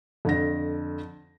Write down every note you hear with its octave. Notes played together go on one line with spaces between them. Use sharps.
F2 D3 A#6